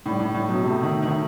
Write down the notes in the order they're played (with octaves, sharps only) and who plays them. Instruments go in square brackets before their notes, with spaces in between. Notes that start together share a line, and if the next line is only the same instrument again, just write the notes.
[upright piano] A2 [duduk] G3
[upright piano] A2 [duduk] G3
[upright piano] A2
[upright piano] B2 [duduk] F#3
[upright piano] C3 [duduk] A3
[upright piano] D#3
D#3